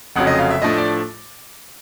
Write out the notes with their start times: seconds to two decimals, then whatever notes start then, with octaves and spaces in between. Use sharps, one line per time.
0.15 F1 F2 C#3 F#3 F#5
0.27 D#5
0.39 F5
0.50 E5
0.62 A2 F3 A3 D4 D#5
0.78 D5